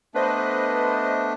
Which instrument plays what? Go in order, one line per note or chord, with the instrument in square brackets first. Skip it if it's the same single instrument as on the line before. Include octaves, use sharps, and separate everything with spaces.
[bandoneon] A3 B3 D4 [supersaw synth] B4 C5 D#5